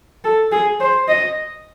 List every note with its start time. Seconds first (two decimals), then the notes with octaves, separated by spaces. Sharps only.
0.24 A4
0.52 G#4
0.80 C5
1.09 D#5